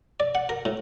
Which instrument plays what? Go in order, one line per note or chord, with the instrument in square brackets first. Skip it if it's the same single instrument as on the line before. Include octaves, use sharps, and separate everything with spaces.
[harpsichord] D5
F#5
A#4
A2